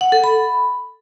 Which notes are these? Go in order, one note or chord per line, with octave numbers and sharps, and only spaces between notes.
F#5
A4
B5